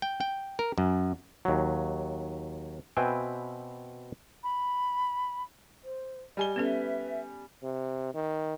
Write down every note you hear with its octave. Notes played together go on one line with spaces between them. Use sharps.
G5
G5
A#4
F#2
D#2 F#3
B2 C4 B4 E5 G5 G#5
B5
C5
G3 D#5 G#5 G7
B3 C#4 A4 B4 E5
C3
D#3